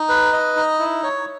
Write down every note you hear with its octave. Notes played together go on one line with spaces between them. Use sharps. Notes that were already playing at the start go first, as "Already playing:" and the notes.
Already playing: D#4
B4
D#5
D#4
E4
C#5